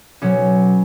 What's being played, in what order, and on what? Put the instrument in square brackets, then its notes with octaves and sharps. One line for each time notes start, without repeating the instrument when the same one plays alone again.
[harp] B1 B2 F#3 C#4